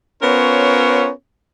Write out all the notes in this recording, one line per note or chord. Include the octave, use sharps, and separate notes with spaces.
B3 C#4 F4 A#4 C5 C#5